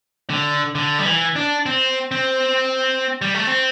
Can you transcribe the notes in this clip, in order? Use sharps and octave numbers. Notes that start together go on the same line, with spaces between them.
D3
D3
G3
E3
D4
C4
C4
G3
A3
C4